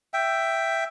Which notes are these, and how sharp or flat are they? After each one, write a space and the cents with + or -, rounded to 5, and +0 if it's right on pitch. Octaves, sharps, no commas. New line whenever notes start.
E5 +10 G5 +0